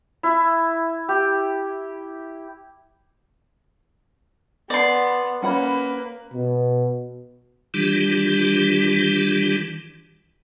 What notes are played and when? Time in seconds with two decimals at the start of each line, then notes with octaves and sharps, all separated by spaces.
0.23 E4
1.09 G4
4.70 B3 D5 C6
5.43 A#3 C#4 B4 F#5 B5
6.34 B2
7.74 D#3 E3 G3 D4 F4 G4